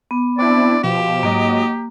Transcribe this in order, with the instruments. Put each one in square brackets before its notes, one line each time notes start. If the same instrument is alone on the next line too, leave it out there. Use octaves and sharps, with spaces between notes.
[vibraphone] B3
[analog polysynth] C4 D4 E4 [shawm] D5
[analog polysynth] B2 F3 E7 [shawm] G4 [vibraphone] F5
[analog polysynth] G#2 F#3 D#5 [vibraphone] A#3